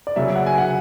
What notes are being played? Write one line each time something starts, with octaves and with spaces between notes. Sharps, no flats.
D5
C#3 F#3 E5
F#5
G#5
F#5